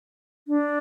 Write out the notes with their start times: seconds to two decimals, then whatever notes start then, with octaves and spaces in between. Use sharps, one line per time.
0.48 D4